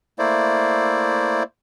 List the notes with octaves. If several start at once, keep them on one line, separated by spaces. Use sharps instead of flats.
A3 A#3 E4 C5 D5